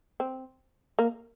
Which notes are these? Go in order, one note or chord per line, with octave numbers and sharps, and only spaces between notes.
C4
A#3